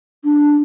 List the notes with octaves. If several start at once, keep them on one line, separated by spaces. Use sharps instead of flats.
D4